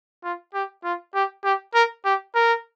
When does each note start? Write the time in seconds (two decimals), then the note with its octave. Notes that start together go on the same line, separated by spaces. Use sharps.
0.24 F4
0.54 G4
0.84 F4
1.15 G4
1.44 G4
1.74 A#4
2.05 G4
2.35 A#4